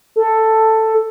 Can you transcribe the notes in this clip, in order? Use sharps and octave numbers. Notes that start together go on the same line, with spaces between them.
A4